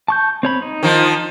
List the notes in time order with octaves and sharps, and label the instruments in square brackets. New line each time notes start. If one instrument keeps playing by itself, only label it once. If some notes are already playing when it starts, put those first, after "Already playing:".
[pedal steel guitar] A5 C#6 G6
C4 C#5 B5
D#4
[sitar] D#3 F3